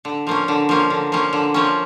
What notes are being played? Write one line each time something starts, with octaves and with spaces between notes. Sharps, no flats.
D3
F3 A#3 C#4
D3
F3 A#3 C#4
D3
F3 A#3 C#4
D3
F3 A#3 C#4